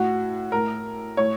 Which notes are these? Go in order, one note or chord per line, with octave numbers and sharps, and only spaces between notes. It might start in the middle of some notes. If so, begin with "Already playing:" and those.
Already playing: A2 F#4
A2 A#4
A2 C#5